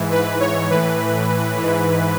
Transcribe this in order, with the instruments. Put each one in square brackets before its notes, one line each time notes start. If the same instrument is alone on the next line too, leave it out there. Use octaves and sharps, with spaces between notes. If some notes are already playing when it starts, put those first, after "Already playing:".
Already playing: [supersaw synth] G#2 E3
B4
C#5
A2 E3 B4
G#2 E3